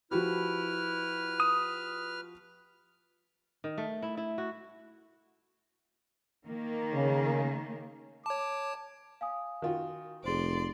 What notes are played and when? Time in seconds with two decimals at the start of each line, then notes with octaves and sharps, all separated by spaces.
0.11 F3 E4 F#4 G4 B4 F6
1.40 D#6
3.64 D#3
3.78 A3
4.02 E4
4.17 E4
4.38 F#4
6.47 D#3 A#3
6.94 C#3
8.26 C#5 A5 D6
9.21 F5 G#5 D#6
9.62 D#3 F4 F#4
10.24 F1 G#4 C5 D5 C6